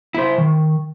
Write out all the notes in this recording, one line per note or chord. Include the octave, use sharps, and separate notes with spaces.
E4 C5
D#3